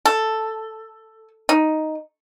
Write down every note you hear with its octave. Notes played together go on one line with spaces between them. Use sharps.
A4
D#4